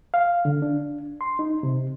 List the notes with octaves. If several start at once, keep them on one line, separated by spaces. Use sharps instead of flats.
F5
D3
D4
C6
D#4
C3